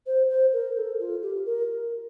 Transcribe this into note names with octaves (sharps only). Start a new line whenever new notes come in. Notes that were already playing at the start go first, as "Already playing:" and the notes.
C5
C5
A#4
A4
F4
G4
A#4